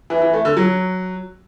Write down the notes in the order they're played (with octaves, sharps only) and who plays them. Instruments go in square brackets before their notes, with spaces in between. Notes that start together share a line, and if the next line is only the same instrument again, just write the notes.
[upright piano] E3
E3
A3
D3
F#3